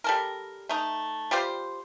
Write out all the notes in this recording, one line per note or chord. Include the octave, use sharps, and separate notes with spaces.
G3 A4 A#4
A3 D#4
G3 F4 G4 C5